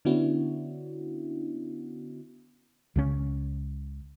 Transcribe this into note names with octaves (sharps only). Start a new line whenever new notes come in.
D3 B3 C#4 D4 E4 F#4
C#2 C#3 C#4